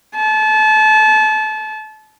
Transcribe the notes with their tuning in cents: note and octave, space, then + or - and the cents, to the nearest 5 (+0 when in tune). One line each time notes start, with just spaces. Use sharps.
A5 -30